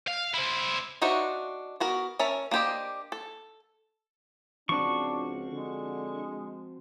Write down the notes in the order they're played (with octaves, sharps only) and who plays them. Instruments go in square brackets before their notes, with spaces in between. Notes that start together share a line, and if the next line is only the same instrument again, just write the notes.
[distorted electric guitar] F5
E4 C5
[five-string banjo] D4 D#4 F#4 C5 E5
B3 F#4 A#4
C#4 A#4 E5 A5
A#3 D4 G4 C5 D#5
A4
[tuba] C#2 [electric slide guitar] F3 C4 F#4 [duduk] D4 [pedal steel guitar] C#6
[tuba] D3 [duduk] G#3